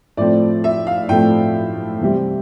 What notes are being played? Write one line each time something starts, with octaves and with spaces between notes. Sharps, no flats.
A2 F3 A3 C4 D5
E5
F5
A2 F3 A3 C4 G5
C3 E3 G3 C4